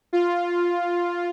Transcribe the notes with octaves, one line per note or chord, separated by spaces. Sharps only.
F4